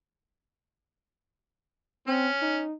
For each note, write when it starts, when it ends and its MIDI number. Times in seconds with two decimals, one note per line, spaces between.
2.07 2.29 60
2.07 2.62 61
2.42 2.75 63